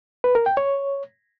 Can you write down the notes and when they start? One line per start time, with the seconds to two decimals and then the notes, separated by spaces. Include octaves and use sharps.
0.24 B4
0.35 A#4
0.46 G5
0.57 C#5